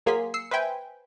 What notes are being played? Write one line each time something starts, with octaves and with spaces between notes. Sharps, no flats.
F#3 A#3 G#4 G#5 C6 B6
E6 C7 C#7
B4 C5 E5 G5 G#5